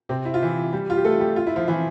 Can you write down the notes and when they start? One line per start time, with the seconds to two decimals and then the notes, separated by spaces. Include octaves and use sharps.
0.09 C3 C4
0.25 E4
0.34 F4
0.42 E3 E4
0.72 G3 G4
0.90 F4
0.97 G4
1.04 A3 A4
1.20 G3 G4
1.36 F4
1.47 E4
1.56 F3 F4
1.67 E3 E4